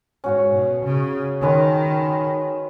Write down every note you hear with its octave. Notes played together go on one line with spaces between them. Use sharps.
G#2 C#4 F#4 C#5
B2
C#3
D#3 G#3 C#4 B4